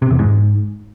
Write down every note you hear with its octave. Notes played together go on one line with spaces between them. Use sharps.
C3
E2
G#2